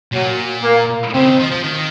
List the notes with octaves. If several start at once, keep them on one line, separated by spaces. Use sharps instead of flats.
A#2 F#3
A#3
C#3 C4
D#3
F3
F3
D#3